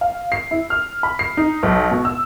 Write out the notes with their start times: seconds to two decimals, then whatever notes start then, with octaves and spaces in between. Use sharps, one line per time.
0.01 F5
0.32 C7
0.51 E4
0.70 F6
1.03 B5
1.19 C7
1.37 D#4
1.63 B1
1.91 B2
2.05 E6